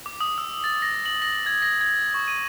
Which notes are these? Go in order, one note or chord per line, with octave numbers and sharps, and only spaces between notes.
D6
D#6
E6
A6
A#6
F#7
A#6
G#6
A#6
G#6
C#6
D#7